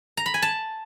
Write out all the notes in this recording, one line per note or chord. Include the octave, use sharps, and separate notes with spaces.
A#5
B5
G#5
A5